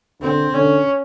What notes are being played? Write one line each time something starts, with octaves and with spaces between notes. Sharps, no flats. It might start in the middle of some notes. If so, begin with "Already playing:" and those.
D3 C4
D3 C#4